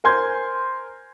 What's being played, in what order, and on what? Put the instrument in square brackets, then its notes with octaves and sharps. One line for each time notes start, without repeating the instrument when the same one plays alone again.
[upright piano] A#4 C5 G#5 C6 G6 G#6